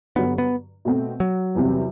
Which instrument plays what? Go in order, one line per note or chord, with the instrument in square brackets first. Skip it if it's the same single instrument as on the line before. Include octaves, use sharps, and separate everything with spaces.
[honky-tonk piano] G2 D3 F#3 [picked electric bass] B3
[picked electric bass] B3
[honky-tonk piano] B2 A3 C4
[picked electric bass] F#3
[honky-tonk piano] E2 C3 G3 C4